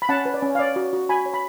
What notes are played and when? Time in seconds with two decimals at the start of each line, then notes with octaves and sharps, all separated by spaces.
0.02 B5
0.09 C#4 F#5 A5
0.25 B4
0.34 D5
0.42 C#4
0.55 F5
0.59 C#5 D5
0.76 F#4
0.93 F#4
1.09 F#4 G#5 B5
1.26 C#5
1.34 B5